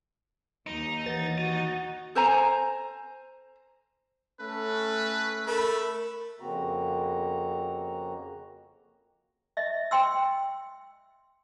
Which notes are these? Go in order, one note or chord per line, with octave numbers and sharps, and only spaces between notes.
D#2 D#4
E3 F#5 A6
D#4 F#4 D#5
A4 C5 G#5 A#5
A3 C#4 A4 B4
A3 A#4 B5
F2 C#3 A#3 C4 F#4 A#5
D#5 E5
G5 C6 E6